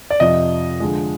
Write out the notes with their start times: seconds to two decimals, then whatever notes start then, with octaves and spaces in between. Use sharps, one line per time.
0.10 D5
0.20 F2 C3 F3 D#5
0.80 D3 F3 G#3